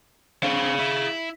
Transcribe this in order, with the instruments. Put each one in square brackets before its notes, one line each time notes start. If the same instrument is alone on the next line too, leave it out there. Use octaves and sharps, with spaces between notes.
[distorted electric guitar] C4 D4 [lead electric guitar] G#4 F5
[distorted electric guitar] E4